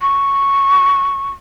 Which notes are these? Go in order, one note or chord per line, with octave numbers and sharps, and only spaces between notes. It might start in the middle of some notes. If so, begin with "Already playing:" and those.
C#6